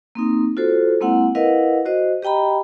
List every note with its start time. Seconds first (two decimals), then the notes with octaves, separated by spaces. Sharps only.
0.15 A#3 C4 D#4
0.57 F4 F#4 A4 C5
1.01 G#3 A#3 C4 E4 F#5
1.35 E4 A#4 B4 D#5 F5 F#5
1.86 F#4 C5 D#5
2.22 G4 D#5 G5 A#5 B5